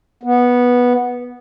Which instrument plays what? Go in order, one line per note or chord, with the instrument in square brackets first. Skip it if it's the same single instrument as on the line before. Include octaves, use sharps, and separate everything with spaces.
[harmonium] B3